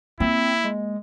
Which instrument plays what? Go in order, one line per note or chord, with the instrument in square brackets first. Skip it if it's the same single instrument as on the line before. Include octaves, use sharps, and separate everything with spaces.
[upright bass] A#3 [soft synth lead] C4 [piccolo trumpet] E4
[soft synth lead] G#3